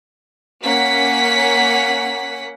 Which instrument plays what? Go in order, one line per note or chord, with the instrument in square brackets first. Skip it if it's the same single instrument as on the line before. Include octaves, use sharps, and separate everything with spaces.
[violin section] A#3 C#4 F#5 B6